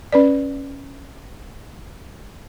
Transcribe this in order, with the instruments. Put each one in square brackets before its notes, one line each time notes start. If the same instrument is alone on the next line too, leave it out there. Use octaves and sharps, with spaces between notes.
[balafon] C#4 B4 D5